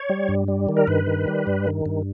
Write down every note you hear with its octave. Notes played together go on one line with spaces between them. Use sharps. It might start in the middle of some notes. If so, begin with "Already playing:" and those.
Already playing: C#5
G3
G2
G3
D#3
A#4
G2 B4
D#3
G3
G2
D#3
G2